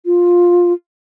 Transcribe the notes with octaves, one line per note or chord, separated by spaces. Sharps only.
F4